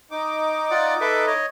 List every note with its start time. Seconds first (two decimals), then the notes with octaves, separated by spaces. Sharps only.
0.11 D#4 D6
0.71 F4 D5 F#5
1.01 A4 B4 E5
1.27 C#5 D#5